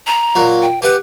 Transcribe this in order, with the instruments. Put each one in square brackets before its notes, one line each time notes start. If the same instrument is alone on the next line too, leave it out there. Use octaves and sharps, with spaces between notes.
[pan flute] A#5
[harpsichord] A#2 F#3
[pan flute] G5
[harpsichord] G4 F#5 [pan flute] B4